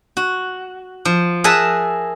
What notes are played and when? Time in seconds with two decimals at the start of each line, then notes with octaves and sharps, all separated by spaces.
0.17 F#4
1.05 F3
1.44 G#4 A#4 E5 F#5 G#5 A5